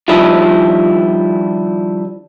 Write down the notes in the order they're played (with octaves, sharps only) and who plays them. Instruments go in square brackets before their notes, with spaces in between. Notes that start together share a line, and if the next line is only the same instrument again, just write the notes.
[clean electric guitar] D#3 F3 G3 D4 E4 F4